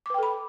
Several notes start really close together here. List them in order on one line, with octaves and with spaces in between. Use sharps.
D6 B4 G5 A4 B5